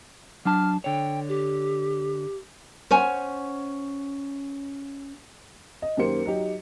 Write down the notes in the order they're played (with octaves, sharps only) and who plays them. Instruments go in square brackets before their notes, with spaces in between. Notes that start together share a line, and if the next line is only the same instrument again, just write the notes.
[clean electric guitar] F#3 D4 A5 [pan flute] F6
[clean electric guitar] D3 C#5 [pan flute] G5
[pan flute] G4
[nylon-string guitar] C#4 C5 C#5 F#5 G#5
[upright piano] D#5
F#2 D#3 A#3 G4 C5 C#7
F#3 D#4 G4